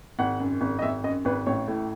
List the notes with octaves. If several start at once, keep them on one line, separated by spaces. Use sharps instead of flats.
G#1 F#5
F#2
G#1
D#5
G#1 E5
F#2 D#5
G#1 B4
A1 C#5
A2